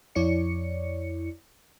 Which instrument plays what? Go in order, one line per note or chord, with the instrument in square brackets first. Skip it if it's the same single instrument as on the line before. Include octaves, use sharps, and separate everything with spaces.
[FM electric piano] F2 E4 C#5 D5 C#7